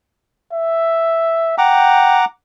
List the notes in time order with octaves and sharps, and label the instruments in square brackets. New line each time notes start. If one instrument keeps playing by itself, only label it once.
[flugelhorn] E5
[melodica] F#5 A#5 D6 [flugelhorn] G5